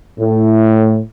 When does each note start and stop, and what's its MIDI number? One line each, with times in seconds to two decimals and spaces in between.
0.20 0.99 45